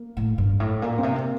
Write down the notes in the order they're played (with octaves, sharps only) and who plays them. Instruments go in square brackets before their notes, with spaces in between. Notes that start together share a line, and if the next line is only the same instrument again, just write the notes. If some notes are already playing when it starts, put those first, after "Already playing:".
Already playing: [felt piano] A#3
[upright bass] A2
G2
A2
[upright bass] A#2 [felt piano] A#3
[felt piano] C4
[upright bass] C3
[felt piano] A#3